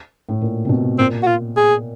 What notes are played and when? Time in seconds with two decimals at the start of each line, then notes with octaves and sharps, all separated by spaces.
0.29 A2
0.41 A#2
0.65 C3
0.69 B2
0.98 A#2 C4
1.23 F#4
1.27 F4
1.57 G#4